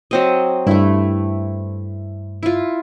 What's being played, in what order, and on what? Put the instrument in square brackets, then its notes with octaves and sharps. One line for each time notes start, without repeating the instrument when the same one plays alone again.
[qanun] F#3 C4 D#5
[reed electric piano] G2 [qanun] A3 E4
[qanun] E4 F4